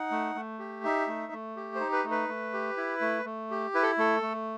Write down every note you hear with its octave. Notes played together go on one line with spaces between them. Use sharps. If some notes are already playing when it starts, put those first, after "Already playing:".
Already playing: D#4 F#5
A3
A3
G4
D#4 E5
A3
A3
G4
D#4 C5
B4
A3
B4
A3
G4
E4
A3
A3
G4
E4 B4
A4
A3 A4
A3